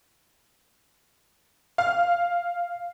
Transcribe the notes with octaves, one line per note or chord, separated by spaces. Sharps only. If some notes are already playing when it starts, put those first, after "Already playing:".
F5